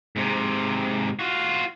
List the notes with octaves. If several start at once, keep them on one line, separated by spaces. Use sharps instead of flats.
G#2 C3
F4 F#4